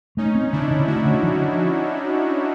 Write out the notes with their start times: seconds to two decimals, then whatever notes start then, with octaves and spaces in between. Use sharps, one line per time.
0.17 A3 C#4 D#4
0.35 C4
0.52 D3 D4 E4
0.71 D3
0.87 A3 E4 F#4
1.05 D3
1.23 F3